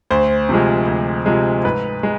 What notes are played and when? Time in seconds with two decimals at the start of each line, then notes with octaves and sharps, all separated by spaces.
0.10 D2 C5
0.49 C3 F3 G#3
0.87 D2
1.26 C3 F3 G#3
1.64 G#2 B4
2.03 G#3